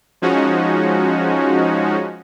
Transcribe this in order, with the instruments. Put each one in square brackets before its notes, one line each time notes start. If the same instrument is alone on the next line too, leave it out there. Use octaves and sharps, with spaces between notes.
[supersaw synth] F3 G#3 C#4 D#4 F#4